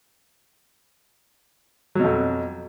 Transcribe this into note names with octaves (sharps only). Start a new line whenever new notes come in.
F2 B2 F#3